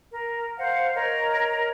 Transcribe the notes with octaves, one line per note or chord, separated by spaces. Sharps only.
A#4
C5 F5 F#5
A#4 C#5 D#5